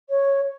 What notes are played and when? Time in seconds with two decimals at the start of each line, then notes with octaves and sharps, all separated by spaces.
0.09 C#5